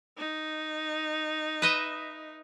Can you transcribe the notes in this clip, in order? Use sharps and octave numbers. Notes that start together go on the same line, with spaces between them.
D#4
B4 D#5 E5